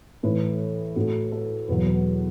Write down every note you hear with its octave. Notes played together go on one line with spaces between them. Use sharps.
A2 E3 A3 B4
A2 A3 F#4
A4
E2 B2 F#3 B4
B4